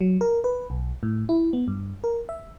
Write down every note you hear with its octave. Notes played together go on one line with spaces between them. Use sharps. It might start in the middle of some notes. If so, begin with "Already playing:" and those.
F#3
A#4
B4
B1
A2
E4
B3
G2
A#4
E5